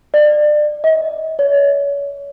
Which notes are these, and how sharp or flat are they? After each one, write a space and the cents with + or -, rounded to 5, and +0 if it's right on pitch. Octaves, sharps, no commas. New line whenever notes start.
D5 +30
D#5 +40
C#5 +35